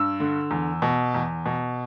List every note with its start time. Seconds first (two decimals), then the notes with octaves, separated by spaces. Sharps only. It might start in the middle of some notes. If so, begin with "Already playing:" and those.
Already playing: G2 E6
0.20 D3
0.51 E2
0.82 B2
1.14 E2
1.46 B2